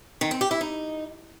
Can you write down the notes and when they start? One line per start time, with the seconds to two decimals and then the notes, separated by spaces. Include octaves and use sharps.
0.21 D#3
0.31 C4
0.41 G4
0.51 E4
0.61 D#4